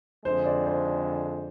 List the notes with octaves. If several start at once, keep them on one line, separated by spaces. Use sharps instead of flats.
F2 D3 G#3 C5
D5
C5